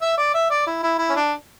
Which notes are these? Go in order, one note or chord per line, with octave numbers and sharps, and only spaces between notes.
E5
D5
E5
D5
E4
E4
E4
C#4
D4